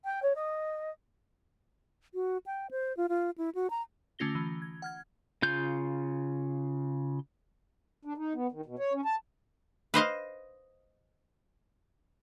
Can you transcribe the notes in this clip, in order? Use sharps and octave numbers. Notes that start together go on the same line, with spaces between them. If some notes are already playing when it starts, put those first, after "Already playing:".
G5
C#5
D#5
F#4
G5
C5
F4
F4
E4
F#4
A#5
D3 A3 C#4 F4 A#6 G7
E3
G#6
F#5 F6 G#6
C#3 F4 G6
D4
D#4
B3
D#3
B2
C#5
C#4
A5
B4 C5 D#5 F5